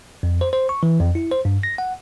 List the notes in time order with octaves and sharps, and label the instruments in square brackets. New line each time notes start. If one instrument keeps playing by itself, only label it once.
[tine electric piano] F2
C5
C5
C#6
E3
F2
E4
C5
G2
A#6
F#5